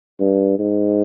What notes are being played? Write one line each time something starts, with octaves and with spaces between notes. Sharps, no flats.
G2
G#2